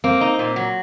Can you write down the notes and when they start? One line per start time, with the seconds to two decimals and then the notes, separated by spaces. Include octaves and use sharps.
0.04 A#3 C4
0.21 D#4
0.39 A#2
0.56 F#3